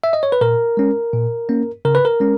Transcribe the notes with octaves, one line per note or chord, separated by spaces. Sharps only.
E5
D#5
C#5
B4
A#2 A#4
G#3 C#4
A#2
A#3 C#4
C#3 A#4
B4
A#4
G#3 C#4